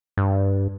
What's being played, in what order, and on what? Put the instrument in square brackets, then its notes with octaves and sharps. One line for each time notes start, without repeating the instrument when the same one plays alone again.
[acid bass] G2